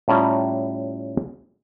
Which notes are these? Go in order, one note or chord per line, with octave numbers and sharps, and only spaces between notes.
A2 G3 C#4 F4 D5 A#5